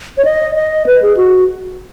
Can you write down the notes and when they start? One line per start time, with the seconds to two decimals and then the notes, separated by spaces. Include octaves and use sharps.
0.17 C#5
0.25 D#5
0.55 D#5
0.86 B4
1.02 G#4
1.17 F#4